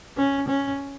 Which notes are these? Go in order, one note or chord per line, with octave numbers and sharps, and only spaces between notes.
C#4
C#4